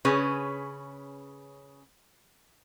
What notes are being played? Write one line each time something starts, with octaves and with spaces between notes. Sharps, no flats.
C#3 C#4 G#4 B4